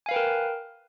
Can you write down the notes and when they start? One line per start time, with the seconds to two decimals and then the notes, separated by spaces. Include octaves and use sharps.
0.06 G#5
0.09 F5
0.11 B4
0.14 G5
0.16 A#4